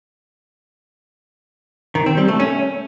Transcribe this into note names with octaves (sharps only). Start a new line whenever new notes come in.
D#3
C4
G3
A3
C#4